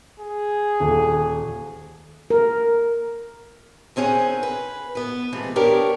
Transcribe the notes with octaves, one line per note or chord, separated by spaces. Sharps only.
G#4
D#1
A#4
D#3 C4 C#4 G#4 F#5
B4
B3 B4
G#2 C3 E3 F3 A3
B3 D4 G4 A#4 C#5